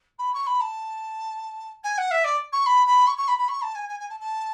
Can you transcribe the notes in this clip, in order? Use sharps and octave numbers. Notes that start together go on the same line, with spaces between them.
B5
C#6
B5
A5
G#5
F#5
E5
D5
C#6
B5
B5
C#6
C#6
B5
B5
C#6
A5
G#5
G#5
G#5
A5
A5